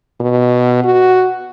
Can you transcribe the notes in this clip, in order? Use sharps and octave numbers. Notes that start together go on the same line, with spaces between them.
B2
F#4